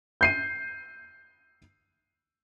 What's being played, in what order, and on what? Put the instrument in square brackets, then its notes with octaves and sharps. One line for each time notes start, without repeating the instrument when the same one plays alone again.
[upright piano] G6 C7 D#7